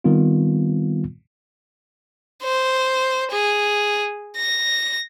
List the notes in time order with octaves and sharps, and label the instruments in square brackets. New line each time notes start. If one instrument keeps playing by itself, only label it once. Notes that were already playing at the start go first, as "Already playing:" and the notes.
[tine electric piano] D#3 G3 B3 C4 F4
[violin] C5
G#4
A#6